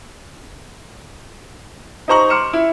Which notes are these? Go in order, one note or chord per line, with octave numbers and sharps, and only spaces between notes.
D#4 G4 C5 A#5 C#6 F#7
C6 D6 F6 C#7 E7
E4